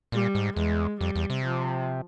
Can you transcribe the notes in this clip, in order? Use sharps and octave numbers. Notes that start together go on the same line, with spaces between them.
A#2 G3
G#2
E2 G#3
F2 G3
E2
C3
F3